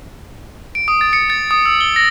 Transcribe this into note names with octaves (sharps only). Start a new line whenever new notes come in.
D7
D#6
A6
C#7
A6
D#6
E6
G7
A#6